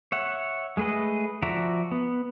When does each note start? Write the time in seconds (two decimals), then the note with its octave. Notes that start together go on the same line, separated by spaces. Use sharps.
0.12 C#5 E5 F#5
0.77 G#3 A3 G#4 B4 D#5
1.42 F3 F#4 D5 E5 A#5
1.91 B3